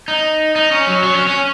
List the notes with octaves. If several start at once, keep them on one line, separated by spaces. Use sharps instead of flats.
D#4
D#4
C#4
F#3
F#3
C#4
C#4